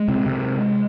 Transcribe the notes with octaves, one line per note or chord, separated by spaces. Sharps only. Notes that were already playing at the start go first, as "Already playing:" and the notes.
Already playing: G#3
C3
C3